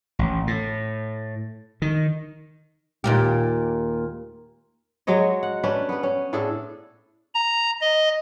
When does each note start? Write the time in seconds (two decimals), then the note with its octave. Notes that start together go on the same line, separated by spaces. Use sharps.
0.19 A1
0.47 A2
1.82 D#3
3.04 D#2 A#2 G4
5.07 F#3 G#3 C#5 D#5
5.43 F#5
5.63 C#4 D4 B4
5.89 B3 B4
6.03 C#4
6.33 A2 D4 G#4 A4
7.35 A#5
7.81 D#5